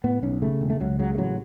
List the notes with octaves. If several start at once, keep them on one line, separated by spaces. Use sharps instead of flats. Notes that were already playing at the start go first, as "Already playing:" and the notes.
A2 B3
B1 C#4
C#3 A3
E1
A3
C#2 F#3
C#3 F#3
A3
A1 F#3